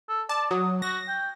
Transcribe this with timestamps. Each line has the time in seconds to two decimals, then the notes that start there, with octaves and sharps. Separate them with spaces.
0.09 A4
0.29 D5 A5
0.51 F#3 D#6
0.82 F#4 A#6
1.08 G5